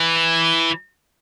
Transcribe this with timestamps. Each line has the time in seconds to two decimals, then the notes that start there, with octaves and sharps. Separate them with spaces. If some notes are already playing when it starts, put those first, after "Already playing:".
Already playing: E3